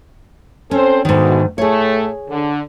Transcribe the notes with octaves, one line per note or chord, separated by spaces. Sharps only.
C4 C#4 A4 C5
D2 G#2 B2 D#3
A2 A3 G#4 C#5
D3